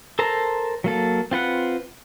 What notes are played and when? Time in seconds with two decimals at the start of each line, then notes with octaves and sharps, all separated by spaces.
0.19 A4 A#4 C5 A5 A#5
0.84 F#3 A#3 A4
1.31 C4 F4 B4 F#5